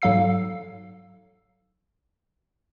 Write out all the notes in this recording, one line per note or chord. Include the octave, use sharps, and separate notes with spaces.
G#2 F#3 A4 F5 E6 C7